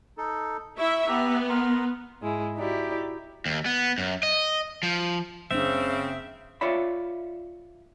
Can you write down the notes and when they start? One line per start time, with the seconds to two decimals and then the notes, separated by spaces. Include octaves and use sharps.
0.18 D#4 A4
0.78 E4 E5 C#6
1.08 B3 G4 E5 A#5
1.49 A#4 A#5 C6
2.21 G#2 G#3 E4
2.56 D#4 E4 F#4 G4 D5
3.46 D#2
3.66 B3
3.98 F#2
4.23 D#5
4.83 F3
5.51 F#1 C#3 C4 D4 E5
6.61 F4 C#5 D5 E5 B5